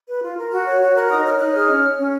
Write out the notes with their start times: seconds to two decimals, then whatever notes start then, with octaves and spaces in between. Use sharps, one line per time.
0.08 B4
0.23 F4
0.37 A#4
0.52 F#4
0.66 C#5
0.81 F#4
0.96 A#4 F#6
1.10 D#4 D#6
1.24 C#5 F6
1.39 D#4 F#6
1.54 G#4 F6
1.69 C#4
1.83 C#5
1.98 C#4